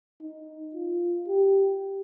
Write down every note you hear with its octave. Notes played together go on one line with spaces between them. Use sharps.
D#4
F4
G4